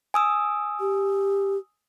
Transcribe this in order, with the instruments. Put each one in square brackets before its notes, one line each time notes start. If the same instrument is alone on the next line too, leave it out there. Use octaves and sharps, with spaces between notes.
[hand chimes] G#5 D#6 E6
[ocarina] G4